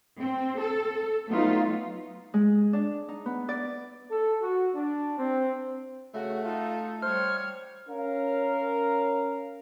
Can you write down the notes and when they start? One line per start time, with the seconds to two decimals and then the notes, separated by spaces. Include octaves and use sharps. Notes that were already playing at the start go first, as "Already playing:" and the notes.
0.20 C4
0.60 A4
1.28 F#3 A3 B3 D#4 F4
2.34 G#3
2.73 D4
3.09 D#4
3.26 B3
3.49 D5
4.10 A4
4.41 F#4
4.74 D4
5.18 C4
6.14 C#3 A3 F#4
6.45 D#4 F4 A4
7.02 G3 C5 C#5 F6
7.89 C#4 A#4 F5